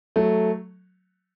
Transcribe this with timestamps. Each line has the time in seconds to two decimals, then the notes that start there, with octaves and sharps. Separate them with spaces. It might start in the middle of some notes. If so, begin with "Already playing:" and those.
0.16 F#3 A3